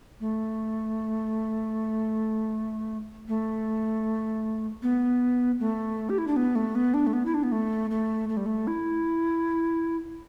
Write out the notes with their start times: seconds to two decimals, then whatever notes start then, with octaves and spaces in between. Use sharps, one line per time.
0.20 A3
3.28 A3
4.82 B3
5.60 A3
6.09 G4
6.18 E4
6.27 D4
6.36 B3
6.55 A3
6.75 B3
6.94 D4
7.07 A3
7.13 B3
7.26 E4
7.34 D4
7.43 B3
7.52 A3
7.90 A3
8.29 A3
8.37 G3
8.46 A3
8.67 E4